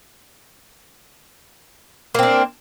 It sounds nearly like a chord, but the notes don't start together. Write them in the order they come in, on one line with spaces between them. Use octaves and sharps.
A#3 C4 D4